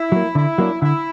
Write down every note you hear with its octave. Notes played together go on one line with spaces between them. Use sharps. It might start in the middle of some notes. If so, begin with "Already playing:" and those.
Already playing: E4
F#3 A#3
D3 E4
F#3 A#3 D4
D3 E4